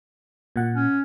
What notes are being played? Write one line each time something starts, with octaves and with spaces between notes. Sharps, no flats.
A#2 F#5
C#4